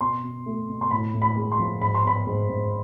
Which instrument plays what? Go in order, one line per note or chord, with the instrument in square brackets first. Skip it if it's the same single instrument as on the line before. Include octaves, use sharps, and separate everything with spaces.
[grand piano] B2 C6
B2
A3
B2
C6
A2 B5
A2
B5
G#3
C6
F3
G#2 B5
C6
B3 B5
G#2
G#2